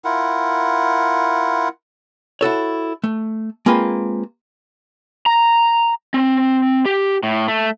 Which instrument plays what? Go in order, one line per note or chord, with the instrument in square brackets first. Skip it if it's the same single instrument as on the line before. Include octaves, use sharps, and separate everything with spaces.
[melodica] E4 F4 A#4 F#5
[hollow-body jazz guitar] E4 F#4 A4 C#5
A3
G#3 A#3 C4 F4 B4
[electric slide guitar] A#5
C4
G4
A2
A3